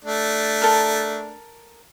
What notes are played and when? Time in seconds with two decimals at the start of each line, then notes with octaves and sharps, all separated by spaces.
0.04 A3 D4
0.62 A4 A#4